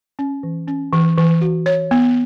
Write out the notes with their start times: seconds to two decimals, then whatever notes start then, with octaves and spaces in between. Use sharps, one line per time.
0.19 C#4
0.43 E3
0.68 C#4
0.93 E3
1.17 E3
1.41 F#4
1.66 C#5
1.91 B3